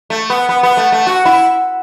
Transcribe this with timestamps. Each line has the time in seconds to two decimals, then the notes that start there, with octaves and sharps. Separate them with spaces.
0.10 A3
0.30 B3
0.49 B3
0.63 B3
0.77 A3
0.92 A3
1.07 F#4
1.25 E4